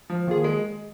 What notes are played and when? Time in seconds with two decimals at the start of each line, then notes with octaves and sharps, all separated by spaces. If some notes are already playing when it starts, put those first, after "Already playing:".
0.10 F3
0.27 D#3 A#3 F4 G#4
0.44 G#3